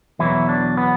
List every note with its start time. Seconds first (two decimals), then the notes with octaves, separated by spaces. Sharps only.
0.19 E2 B2 E3 F#3 E4
0.49 D4
0.77 B3